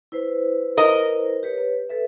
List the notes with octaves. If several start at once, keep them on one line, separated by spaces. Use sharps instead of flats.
E4 B4 C5
A#4 D#5
G4 B4 C#5
A4 B4 E5